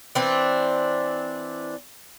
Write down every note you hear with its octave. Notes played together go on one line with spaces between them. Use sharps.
E3 C4 D4